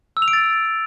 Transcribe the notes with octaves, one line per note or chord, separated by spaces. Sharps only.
E6
F7
D7
A6